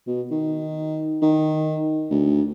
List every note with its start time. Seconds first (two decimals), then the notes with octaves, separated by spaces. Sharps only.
0.07 B2
0.31 D#3
1.22 D#3
2.11 D2